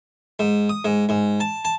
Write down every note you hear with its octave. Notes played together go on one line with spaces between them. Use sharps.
G#2
D#6
G#2
G#2
A5
A5